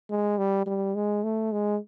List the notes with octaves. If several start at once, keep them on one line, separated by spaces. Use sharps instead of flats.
G#3
G3
G3
G#3
A3
G#3